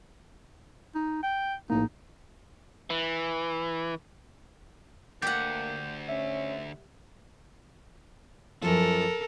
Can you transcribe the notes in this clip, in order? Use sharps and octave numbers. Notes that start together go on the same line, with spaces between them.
D#4
G5
A#1 A2 A#3 D#4
E3
D2 A#3 G4 F#5 G6
C#4 E5
F#2 F3 A4 A#4